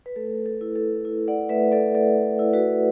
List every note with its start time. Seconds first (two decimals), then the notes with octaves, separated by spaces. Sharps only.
0.06 B4
0.16 A3 A4
0.46 A4
0.61 E4
0.76 A4
1.05 E4
1.28 D5 F#5
1.49 A3 B4 E5
1.72 A4 D5
1.95 A3 A4 D5
2.39 E4
2.53 F#4 B4